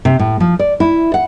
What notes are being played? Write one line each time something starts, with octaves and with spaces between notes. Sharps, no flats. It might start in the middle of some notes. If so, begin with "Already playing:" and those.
C3
A2
F3
D5
E4
F#5